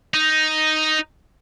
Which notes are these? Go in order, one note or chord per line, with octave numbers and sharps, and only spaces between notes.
D#4